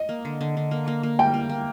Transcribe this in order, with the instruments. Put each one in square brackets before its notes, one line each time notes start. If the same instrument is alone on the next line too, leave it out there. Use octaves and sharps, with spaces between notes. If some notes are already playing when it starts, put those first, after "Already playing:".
Already playing: [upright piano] D#5
[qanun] A#3
D3
D3
D3
A#3
A#3
A#3
[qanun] G3 [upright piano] G5
[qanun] A#3
A#3